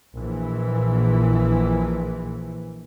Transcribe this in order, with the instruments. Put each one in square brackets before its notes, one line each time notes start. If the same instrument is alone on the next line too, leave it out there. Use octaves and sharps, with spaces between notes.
[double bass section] A#1 E3